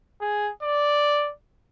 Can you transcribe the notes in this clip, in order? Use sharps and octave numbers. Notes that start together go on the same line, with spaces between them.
G#4
D5